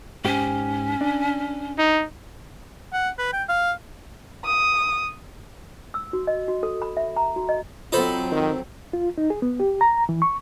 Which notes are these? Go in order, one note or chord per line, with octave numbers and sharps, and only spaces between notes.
G#2 C#4 G4
D4
D#4
F#5
B4
G5
F5
D#6
E6
F#4
D#5
F#4
A4
B5
E5
A#5
F#4
D#5
F#3 C4 D#4 F4 A4 C5 B5
D#3
F4
D#4
G#4
B3
G4
A#5
E3
C#6